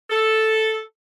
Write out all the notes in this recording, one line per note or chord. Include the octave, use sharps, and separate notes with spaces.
A4